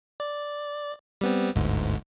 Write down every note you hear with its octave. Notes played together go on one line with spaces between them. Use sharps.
D5
G3 B3 C4
G1 D2 G#2